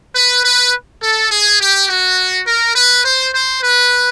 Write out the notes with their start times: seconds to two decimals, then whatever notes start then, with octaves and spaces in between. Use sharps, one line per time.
0.15 B4
0.44 B4
1.02 A4
1.31 G#4
1.60 G4
1.89 F#4
2.47 A#4
2.76 B4
3.05 C5
3.34 C5
3.62 B4